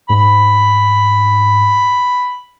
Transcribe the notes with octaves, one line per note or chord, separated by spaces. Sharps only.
G#2 B5